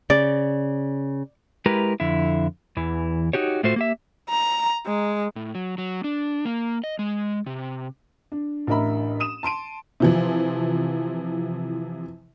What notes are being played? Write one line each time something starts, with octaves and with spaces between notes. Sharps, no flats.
C#3 D5
G#3 E4 G4 A#4 B4 A#5
F2 D3 E4
E2 E3
D#4 F#4 G4 C#5
A2 A3 F4 F#4 C5
A#3 G4 E5
A#5
G#3
A2
F#3
F#3
D4
A#3
D#5
G#3
C3
D4
A1 D4 A#4 D#5 E5 B5
D#6 D#7 E7
A5 C6 D7 D#7
C3 E3 F3